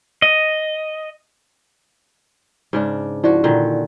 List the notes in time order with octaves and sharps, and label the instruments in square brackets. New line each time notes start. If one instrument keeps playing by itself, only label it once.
[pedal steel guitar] D#5
[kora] G#2 C#3 D4
[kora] F3 F#4 [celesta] E4 D5
[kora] A#2 D3 D#3